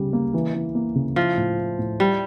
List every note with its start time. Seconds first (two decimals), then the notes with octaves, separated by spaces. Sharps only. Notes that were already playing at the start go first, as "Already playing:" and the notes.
Already playing: C#3 G3
0.13 A#3
0.34 E3
0.54 E3
0.75 A#3
0.95 C#3
1.16 F3 E4
1.37 A2
1.58 E4
1.79 A2
1.99 G3 E4